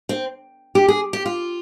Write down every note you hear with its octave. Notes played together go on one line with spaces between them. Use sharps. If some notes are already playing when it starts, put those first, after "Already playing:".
C4
G4
G#4
G4
F4